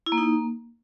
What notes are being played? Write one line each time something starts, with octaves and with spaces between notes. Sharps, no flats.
E4
A#3
D#4
A#3